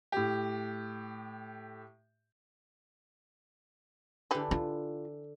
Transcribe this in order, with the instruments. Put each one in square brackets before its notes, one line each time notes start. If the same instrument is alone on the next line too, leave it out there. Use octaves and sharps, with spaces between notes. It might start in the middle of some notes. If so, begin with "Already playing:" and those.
[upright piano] A2 G4
[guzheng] D3 C6 [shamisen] E3 G4 B4
[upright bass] F4